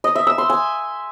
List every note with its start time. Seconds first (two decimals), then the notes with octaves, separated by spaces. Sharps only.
0.04 D#5
0.15 E5
0.27 E6
0.38 C6
0.50 G#5